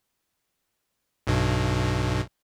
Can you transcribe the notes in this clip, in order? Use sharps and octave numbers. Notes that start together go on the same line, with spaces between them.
B1 G2 B2